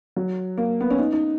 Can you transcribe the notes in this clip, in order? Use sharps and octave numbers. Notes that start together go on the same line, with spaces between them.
F#3
A#3
B3
C#4
D#4
D#4